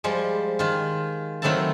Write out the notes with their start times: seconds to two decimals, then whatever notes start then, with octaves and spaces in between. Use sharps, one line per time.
0.04 F3 G3 G#3
0.59 D#3 F4
1.42 D#3 F#3 A3 C4 E4 A5